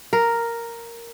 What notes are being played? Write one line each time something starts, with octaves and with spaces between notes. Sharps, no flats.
A#4